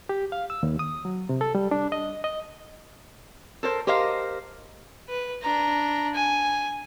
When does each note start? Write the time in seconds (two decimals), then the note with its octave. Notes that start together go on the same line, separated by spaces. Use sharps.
0.09 G4
0.32 F5
0.50 E6
0.63 D#2
0.79 D#6
1.05 F#3
1.29 C3
1.41 A4
1.55 G3
1.71 D4
1.92 D#5
2.24 D#5
3.63 A4 A#4 C5
3.87 G4 A#4 C5 D#5 F5
5.09 B4
5.43 D4 A#5
6.15 G#5